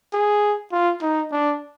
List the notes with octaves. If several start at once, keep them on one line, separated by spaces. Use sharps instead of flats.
G#4
F4
D#4
D4